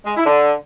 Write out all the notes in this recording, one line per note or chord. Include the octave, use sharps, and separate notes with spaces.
G#3
E4
D3